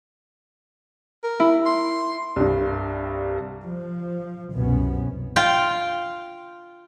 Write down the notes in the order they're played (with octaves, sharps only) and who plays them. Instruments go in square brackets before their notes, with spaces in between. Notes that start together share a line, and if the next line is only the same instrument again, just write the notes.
[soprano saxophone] A#4
[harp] E4
[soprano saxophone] C6
[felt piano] C2 G2
[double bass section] F3
C2 F#2 B2 B3 C#4
[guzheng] F4 G5